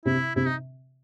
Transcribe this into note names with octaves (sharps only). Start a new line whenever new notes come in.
C3 E4
C3 E4
D#4